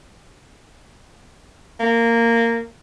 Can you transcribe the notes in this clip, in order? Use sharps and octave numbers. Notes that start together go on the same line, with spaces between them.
A#3